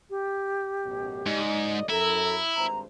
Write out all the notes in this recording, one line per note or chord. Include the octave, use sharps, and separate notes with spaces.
G4
A1 F#2 B2
F#1 G#2 D5 D#5
F#2 E4 A4 A#4 A#5
G#1 G2 C5 A#5